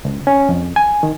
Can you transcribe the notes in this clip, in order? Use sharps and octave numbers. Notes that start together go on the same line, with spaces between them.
C#2
C#4
F2
G#5
D#3